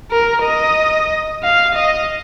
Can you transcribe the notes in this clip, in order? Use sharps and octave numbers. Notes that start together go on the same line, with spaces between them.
A#4
D#5
F5
D#5